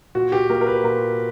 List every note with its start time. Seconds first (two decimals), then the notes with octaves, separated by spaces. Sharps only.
0.15 A#2 F#4
0.32 G4
0.50 A#3 A#4
0.61 A#4
0.67 B4
0.84 A#2 A#4